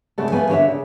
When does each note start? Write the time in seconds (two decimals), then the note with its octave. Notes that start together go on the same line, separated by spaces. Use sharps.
0.18 C#3 A3 C4 F#4 A4
0.32 E3 F3 A3 B3 G#5
0.48 D3 F#4 A4 C#5 E5
0.68 C#3